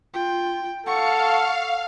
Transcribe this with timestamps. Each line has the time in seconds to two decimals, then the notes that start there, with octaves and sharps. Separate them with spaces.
0.14 F4 G5
0.86 A4 F5 F#5 C#6 C#7